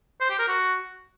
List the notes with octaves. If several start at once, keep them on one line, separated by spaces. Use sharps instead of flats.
C5
G4
A#4
F#4